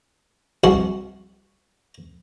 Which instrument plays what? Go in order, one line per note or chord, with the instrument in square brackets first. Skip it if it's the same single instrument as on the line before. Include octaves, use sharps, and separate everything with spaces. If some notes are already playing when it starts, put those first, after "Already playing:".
[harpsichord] C2 F#4 C6